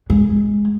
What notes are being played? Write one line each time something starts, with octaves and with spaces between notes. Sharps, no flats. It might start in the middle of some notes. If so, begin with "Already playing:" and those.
G#3